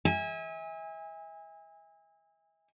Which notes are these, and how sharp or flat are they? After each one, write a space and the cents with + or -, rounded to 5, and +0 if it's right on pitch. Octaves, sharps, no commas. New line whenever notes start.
E5 -35 G#5 -25